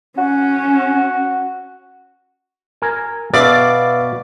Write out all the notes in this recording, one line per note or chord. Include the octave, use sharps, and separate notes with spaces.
C#4 F#4
A#4 G#5
B2 B4 D5 E5 F5